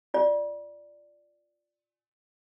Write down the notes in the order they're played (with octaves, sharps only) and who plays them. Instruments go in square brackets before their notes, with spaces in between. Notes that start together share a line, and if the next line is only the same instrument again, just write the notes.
[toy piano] F4 D5